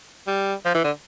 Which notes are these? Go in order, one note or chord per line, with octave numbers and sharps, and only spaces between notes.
G3
F3
E3
D3